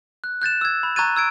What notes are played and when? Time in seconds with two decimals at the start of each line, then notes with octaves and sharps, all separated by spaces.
0.24 F#6
0.42 F#6 G6 A6 E7
0.61 E6 G#6
0.83 B5
0.96 A#5 C#6 F#6 G#6 A6 D#7
1.16 E6 G#6 D7